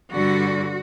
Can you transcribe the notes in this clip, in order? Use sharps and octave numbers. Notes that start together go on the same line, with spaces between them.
G2 D3 G3 F#4